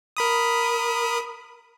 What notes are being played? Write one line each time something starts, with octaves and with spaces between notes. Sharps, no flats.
A#4 B5 D#6